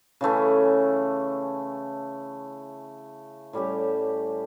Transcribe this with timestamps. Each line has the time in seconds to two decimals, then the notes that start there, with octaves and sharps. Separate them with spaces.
0.21 C#3 E3 A3 C#4
3.53 A2 G3 C#4 G4